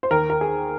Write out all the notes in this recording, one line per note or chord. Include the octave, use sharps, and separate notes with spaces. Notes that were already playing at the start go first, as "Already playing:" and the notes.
C5
D#2 A#4
A#4
G#4